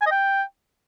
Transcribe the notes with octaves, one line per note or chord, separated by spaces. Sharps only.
G#5
D#5
G5